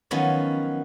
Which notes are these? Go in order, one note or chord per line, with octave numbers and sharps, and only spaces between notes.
D#3 F3 F#3 B3 C#4